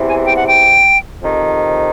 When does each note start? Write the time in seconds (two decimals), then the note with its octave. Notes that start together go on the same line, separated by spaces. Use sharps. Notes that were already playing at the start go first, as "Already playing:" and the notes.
Already playing: E2 C3 E3
0.09 G#5
0.25 G5
0.37 F#5
0.47 G5
1.20 F2 C3 D#3